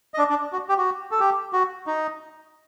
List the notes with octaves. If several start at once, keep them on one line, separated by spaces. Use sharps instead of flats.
D#5
D4 D5
D4 D5
F#4
G4
F#4
A4
G4
F#4
D#4